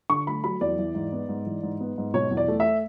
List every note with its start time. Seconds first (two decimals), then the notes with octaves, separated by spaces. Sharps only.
0.10 D3 C#6
0.27 A3 B5
0.44 F#3 B5
0.61 E2 D5
0.79 E3
0.95 G#2
1.12 B3
1.29 G#2
1.46 E3
1.63 G#2
1.80 B3
1.98 G#2
2.14 B2 C#5
2.31 E2
2.37 D5
2.48 A3
2.60 E5